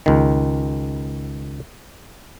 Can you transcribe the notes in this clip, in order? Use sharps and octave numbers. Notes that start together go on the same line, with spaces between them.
C#2 D#3